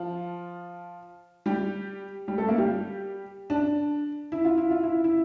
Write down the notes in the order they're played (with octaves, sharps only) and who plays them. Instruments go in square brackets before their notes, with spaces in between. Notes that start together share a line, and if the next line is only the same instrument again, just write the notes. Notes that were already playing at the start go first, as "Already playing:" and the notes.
Already playing: [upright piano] F3 F4
G3 G4
G3 G4
A3 A4
A#3 A#4
G3 G4
D4
E4
F4
E4
F4
E4
E4